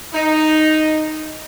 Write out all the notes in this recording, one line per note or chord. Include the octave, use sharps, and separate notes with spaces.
D#4